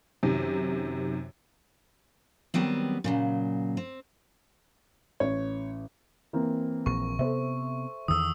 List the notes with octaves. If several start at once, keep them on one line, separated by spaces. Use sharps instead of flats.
F#2 C3 D#3
D#3 F#3 G3 B3 C4
A#2 C#3 F#3
C4
A1 C#5
E3 A#3 C4
A#1 C#6
C3 B3 A4 C5 E5
E2 D#3 D#6 E6